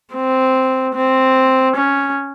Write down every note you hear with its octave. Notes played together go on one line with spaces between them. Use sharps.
C4
C4
C#4